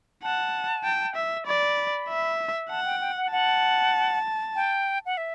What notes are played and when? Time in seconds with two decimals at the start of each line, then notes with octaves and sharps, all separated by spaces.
0.23 F#5 A5
0.84 G5
1.16 E5
1.46 D5 B5
2.08 E5
2.70 F#5 A5
2.86 G5
3.01 G5
3.17 F#5
3.32 F#5 A5
4.55 G5
5.06 F#5
5.17 E5